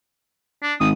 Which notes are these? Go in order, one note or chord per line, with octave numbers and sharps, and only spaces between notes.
D4
G#1 D#6